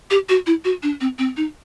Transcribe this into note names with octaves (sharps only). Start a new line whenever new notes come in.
G4
F#4
E4
F#4
D4
C4
C4
D#4